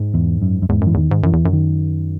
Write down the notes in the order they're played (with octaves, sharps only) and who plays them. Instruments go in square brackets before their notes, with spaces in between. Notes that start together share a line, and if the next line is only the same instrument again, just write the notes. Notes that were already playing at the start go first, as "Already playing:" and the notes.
Already playing: [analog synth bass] G#2
[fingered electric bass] E2
F#2
F#2
[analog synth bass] E2 [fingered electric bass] G#2
[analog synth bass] F#2
[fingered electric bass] E3
[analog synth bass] E2 [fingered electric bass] D#3
[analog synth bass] G#2
[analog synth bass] F#2 [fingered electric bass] E3
[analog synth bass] E2
F#2
[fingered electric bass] D#3